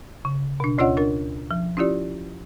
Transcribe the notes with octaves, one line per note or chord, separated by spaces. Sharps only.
C#3
B2 D4
D2 C#4 F4 C#5 D#5 F#5
D4 A#4
F3
C#4 E4 F4 G4 D5